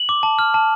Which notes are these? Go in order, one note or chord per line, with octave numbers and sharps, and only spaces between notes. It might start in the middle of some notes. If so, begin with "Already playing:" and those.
Already playing: F#7
D6
A5
F6
A5